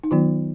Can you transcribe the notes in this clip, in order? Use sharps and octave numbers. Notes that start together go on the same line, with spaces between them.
D#4
D#3 F#3 B3 F4